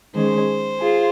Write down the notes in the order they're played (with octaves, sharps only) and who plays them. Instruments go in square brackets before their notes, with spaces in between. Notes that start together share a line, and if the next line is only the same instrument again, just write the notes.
[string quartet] D#3 G#3 C#4 G#4 [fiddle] C5
[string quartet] F4 G#4